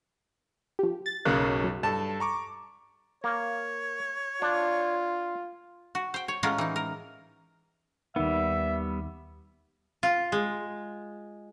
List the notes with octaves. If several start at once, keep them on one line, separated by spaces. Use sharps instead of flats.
F3 G4
A6
B1 F#2 C#3 A#3 F#6
F#3
G2 A4 A5
A#5 C#6 D6
A#3 C#5
D4 F4
F#4
C5 G5
C#5
A2 G#3 C#4 F4 A#4 F#5
E3 D#4
A#4
D#2 D#3 G3 B3 E5
F4
G#3